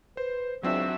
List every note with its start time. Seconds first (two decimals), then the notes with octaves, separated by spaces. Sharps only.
0.17 B4 C5
0.63 C#2 F#3 C4 D4 F#4 E5